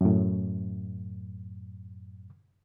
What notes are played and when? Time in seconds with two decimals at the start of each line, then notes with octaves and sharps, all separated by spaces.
0.01 F#2 A2